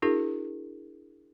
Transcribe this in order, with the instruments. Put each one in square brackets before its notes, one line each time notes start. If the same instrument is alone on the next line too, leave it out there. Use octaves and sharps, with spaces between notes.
[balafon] D4 E4 F#4 G#4 A#4